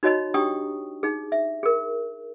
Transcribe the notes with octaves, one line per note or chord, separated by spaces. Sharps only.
D#4 F#4 C#5 D#5 A#5 B5
D4 G4 G5 A#5 C#6 D#6
D#4 G#4
E5
G#4 A#4